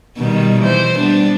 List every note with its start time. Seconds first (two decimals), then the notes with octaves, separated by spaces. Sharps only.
0.17 B2 D#3 G3
0.61 E3 C5
0.98 G3 B3 D4